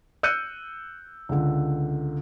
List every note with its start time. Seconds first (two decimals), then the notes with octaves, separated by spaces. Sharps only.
0.23 E6 F#6 G6 C#7 D#7
1.29 C#2 D3